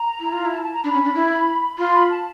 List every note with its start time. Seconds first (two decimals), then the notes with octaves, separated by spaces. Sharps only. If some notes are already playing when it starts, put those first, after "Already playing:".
Already playing: A#5
0.20 E4
0.32 F4
0.45 E4
0.52 A5
0.63 A5
0.73 A#5
0.84 D4 B5
0.94 C#4
1.05 D4
1.15 E4
1.78 F4 C6
1.94 B5
2.11 A5